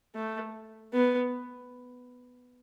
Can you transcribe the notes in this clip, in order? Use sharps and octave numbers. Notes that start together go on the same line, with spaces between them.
A3
B3